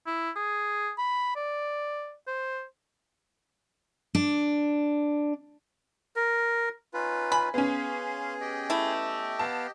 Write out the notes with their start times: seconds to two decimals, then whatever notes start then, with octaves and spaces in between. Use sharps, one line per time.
0.06 E4
0.36 G#4
0.98 B5
1.36 D5
2.27 C5
4.15 D4
6.16 A#4
6.94 C#4 D#4 F4 B4
7.32 G#5 B5
7.54 B3 C#4 G#4 F5 C6
8.41 G4 D#5 G5
8.70 A3 E4
9.39 B3 F5 A5